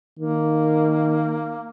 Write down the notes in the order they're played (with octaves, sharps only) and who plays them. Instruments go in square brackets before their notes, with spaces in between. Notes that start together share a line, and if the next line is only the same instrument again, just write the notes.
[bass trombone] D#3 [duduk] A#3